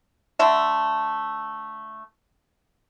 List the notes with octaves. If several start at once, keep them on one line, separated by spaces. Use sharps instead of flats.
D3 A3 E5